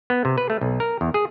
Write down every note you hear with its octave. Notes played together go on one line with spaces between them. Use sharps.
B3
C3
B4
A3
B1
A#4
E2
G#4